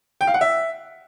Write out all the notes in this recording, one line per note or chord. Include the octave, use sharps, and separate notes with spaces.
G5
F5
F#5
E5